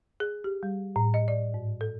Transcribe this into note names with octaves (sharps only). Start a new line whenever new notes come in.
G#4
G4
G3
A2
D#5
D5
G#2
A4